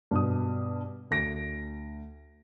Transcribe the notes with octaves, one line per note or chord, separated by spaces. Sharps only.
G2 B2 D#6
D2 A#6 D7